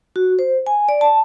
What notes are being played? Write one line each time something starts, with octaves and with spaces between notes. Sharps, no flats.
F#4
C5
G#5
D5
A5